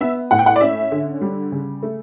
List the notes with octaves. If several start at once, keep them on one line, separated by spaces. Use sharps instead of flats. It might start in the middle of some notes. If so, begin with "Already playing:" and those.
B3 E5
A2 F#5
G5
F#5
D5
C#4 E5
D3
G3
C#3
A3